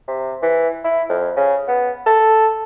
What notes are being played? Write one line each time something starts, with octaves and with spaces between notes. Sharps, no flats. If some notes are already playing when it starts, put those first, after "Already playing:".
C3
E3
E4
F2
C#3
B3
A4